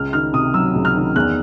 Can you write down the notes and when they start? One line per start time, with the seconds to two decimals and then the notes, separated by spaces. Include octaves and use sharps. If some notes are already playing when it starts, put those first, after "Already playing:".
Already playing: C#2 F6
0.13 D#3 F6
0.33 C3 D#6
0.54 F#3 E6
0.75 C#2
0.85 F6
0.95 D#3
1.16 E2 F#6